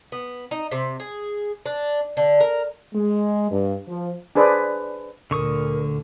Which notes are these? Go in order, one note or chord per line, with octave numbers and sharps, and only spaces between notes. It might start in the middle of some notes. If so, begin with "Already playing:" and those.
B3
D#4
C3
G#4
D4
D3
A#4
G#3
G2
F3
D4 G#4 B4 C5 D5
D2 A#2 D3 A#4 C#6 D#6